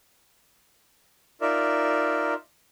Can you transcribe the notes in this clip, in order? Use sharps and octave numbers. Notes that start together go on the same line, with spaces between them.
D#4 F4 A#4 D5 E5